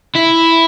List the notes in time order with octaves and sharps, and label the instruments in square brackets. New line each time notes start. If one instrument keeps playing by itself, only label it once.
[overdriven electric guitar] E4